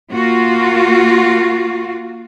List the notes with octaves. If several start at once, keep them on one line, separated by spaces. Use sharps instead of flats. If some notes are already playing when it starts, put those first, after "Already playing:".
A#3 F4 F#4